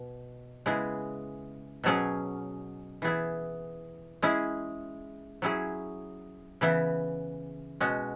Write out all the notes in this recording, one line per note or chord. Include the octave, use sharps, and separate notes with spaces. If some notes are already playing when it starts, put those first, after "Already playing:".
Already playing: B2
C#3 G#3 B3 E4 G#4
B2 F#3 C#4 G#4
E3 B3 E4 G#4
G#3 C#4 E4 G#4
F#3 C#4 E4 G#4
C#3 E3 B3 E4
B2 G#3 C#4 F#4